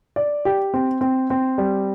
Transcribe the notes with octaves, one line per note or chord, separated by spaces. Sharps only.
D5
G4
C4
C4
C4
G3